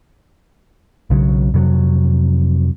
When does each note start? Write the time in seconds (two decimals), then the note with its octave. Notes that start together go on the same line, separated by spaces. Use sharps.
1.10 B1 C#3 F3 F#3
1.54 F2 C3 F#3